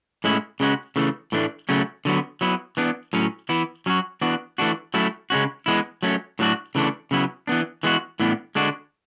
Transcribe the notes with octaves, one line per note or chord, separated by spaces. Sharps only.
A2 G#3 C#4 E4
C#3 G#3 C#4 F#4
C#3 E3 A3
A2 E3 A3 D4
C#3 F#3 A3 C#4
D3 F#3 B3
F#3 B3 E4
E3 B3 D4
A2 F#3 C#4
E3 B3 E4
F#3 C#4 F#4
E3 B3 D4 F#4
E3 A3 D4 F#4
F#3 A3 C#4 E4
C#3 G#3 C#4 F#4
E3 G#3 B3 E4
F#3 A3 C#4
A2 F#3 A3 D4 F#4
C#3 E3 A3 D4
C#3 F#3 B3 E4
E3 B3 D4
E3 G#3 B3 F#4
A2 E3 B3 D4
D3 G#3 D4 F#4